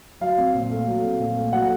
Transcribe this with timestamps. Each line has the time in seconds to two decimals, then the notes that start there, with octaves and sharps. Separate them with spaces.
0.21 F#3 F5
0.38 C4
0.55 A#2
0.70 A3
0.87 F#3
1.04 C4
1.20 A#2
1.36 A3
1.53 F#3 F#5